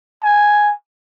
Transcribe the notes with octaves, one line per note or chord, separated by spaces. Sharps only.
G#5